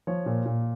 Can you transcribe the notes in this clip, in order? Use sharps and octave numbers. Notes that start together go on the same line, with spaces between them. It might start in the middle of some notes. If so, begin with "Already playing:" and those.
F3 C#5
A#2
A#2